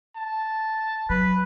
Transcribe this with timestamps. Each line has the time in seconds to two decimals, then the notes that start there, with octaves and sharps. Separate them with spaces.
0.16 A5
1.10 F#3 B4